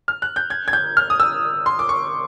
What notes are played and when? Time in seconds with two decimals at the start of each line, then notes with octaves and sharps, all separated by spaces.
0.08 F6
0.22 F#6
0.36 G6
0.50 G#6
0.68 G#6
0.73 G6
0.97 F6
1.10 D#6
1.20 E6
1.66 C6
1.79 D6
1.89 C#6